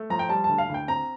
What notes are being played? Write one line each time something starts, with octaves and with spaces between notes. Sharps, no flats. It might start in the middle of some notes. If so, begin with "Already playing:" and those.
Already playing: A3
F3 A#5
G5
G3 A5
D2 A5
F5
D2 G5
C4 A#5